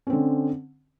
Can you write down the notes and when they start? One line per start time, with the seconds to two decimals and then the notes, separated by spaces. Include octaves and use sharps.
0.07 C#4
0.10 C4
0.13 D3